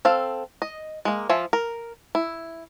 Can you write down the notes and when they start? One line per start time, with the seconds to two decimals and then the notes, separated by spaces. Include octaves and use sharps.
0.05 C4 A4 F5
0.62 D#5
1.05 G#3 A#3
1.29 F3 F4 E5 G#5
1.53 A#4
2.15 E4